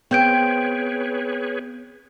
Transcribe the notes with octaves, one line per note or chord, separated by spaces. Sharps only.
B3 C4 G#4 B4 C#5 G6 D7